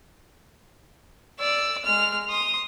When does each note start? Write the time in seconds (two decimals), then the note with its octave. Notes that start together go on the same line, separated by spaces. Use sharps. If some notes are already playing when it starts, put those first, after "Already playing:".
1.39 D5 E6
1.84 G#3 F6
2.29 C6 D#6